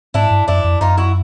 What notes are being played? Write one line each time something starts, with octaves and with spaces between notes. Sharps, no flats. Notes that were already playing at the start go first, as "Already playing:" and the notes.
G#2 D4 E4
G2
F#2 D4 E4
F2
F#2 D#4 F4
E4 F#4